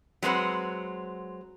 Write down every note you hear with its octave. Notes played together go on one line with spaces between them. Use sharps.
F#3 G#3 C4 B4 F#5